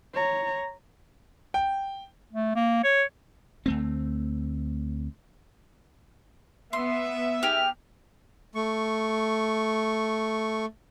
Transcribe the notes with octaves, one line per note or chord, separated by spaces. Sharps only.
C#5 A#5
G5
A3
A#3
C#5
D2 A3 C4
B3 E5 C6
D#4 G4 G#4 F6
A3 C#6